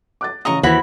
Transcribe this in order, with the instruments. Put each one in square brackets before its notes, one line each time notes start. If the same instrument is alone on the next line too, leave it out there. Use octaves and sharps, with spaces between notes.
[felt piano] D6 F#6 A6
[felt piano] A1 C#3 D#6 [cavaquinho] D#5 A#5 C#6
[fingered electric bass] D#2 E3 [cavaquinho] E4 F#4 B5 [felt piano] C5